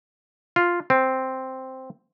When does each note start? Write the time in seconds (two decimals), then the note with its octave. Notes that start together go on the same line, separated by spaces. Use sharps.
0.56 F4
0.90 C4